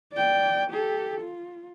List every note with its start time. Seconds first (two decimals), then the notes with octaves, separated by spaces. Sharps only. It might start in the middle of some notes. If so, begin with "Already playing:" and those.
0.13 D5 G5
0.70 G4 A4
1.20 F4